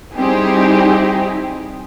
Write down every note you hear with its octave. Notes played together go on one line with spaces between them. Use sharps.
G3 C4 D#4 E4 G4 G#4